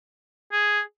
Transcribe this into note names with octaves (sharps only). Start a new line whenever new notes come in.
G#4